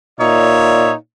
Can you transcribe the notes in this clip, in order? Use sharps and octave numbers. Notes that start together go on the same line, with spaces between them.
A#2 D#4 C#5 D5 E5